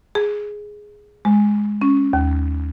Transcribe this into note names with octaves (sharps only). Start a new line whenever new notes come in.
G#4
G#3
C#4
D#2